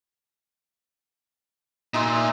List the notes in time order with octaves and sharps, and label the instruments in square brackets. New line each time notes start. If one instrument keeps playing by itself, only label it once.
[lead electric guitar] A#2 [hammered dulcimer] D#4 E5 C6